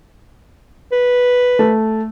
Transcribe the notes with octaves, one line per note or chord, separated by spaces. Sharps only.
B4
A3